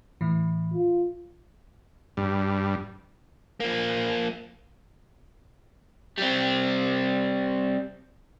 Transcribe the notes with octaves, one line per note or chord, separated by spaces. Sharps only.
A2 E3
F4
G2
F3 A#3
G3 C4